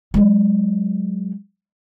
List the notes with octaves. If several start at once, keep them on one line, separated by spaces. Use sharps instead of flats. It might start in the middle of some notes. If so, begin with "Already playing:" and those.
F#3 G#3